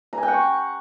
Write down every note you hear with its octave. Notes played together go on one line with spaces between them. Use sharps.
A#5
G#5
G5
F#5
C#6